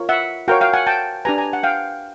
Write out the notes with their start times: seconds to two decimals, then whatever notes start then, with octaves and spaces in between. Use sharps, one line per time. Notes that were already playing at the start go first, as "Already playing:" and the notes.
Already playing: F4 A#4 C#5
0.09 E5 F#5
0.48 F#4 A#4 C#5 F5 G5
0.61 F5 G5
0.73 F#5 G#5
0.87 G5 A5
1.25 D4 G4 B4 G#5 A#5
1.38 G#5 A#5
1.53 F#5
1.63 F5 G5